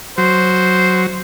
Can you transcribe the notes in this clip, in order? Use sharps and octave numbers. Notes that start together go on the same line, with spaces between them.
F#3 C5